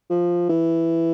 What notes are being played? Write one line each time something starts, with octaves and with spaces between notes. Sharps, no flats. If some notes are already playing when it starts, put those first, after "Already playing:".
F3
E3